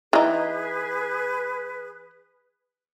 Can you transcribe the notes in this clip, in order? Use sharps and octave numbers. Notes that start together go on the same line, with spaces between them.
E3 D#4 G#4 B4